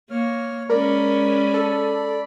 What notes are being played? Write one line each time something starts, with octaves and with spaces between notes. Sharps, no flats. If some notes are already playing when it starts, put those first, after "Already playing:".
A#3 C#5 F6
G#3 C#4 A#4 D5 B5
A4